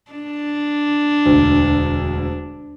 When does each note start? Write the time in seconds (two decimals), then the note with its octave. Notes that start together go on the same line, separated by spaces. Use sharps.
0.11 D4
1.26 E1 D2